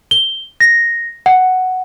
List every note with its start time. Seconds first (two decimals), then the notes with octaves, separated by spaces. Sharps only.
0.11 G7
0.60 A#6
1.26 F#5